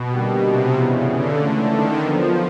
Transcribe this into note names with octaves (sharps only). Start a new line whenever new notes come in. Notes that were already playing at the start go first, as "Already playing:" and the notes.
Already playing: B2
D3 G3 A#3 D#4 G4
C3
G2 C#3 E3 G3 B3
D3
C#2 C#3 E3 A3 C#4
D#3
D#2 D3 F3 F#3 B3